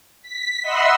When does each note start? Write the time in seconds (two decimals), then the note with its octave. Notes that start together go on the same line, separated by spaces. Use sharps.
0.22 B6
0.62 D#5 E5 F#5 B5 C6 E6